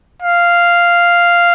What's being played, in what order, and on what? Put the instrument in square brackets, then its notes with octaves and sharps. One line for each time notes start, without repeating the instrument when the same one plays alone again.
[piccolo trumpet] F5